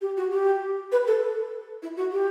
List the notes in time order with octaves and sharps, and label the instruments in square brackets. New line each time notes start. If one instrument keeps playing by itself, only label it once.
[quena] G4
F#4
G4
B4
A4
E4
F#4
G4